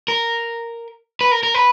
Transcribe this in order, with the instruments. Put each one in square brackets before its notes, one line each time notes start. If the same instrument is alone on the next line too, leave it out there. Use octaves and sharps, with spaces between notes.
[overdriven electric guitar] A#4
B4
A#4
A#4
B4